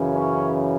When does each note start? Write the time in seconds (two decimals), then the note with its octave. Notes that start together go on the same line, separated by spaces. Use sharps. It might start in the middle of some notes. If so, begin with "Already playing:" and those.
Already playing: F#2 C#3 E3
0.14 C#4